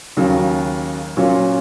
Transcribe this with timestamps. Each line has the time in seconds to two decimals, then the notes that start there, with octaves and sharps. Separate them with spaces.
0.17 D#2 C#3 F#3
1.17 A#2 F#3 C#4 F4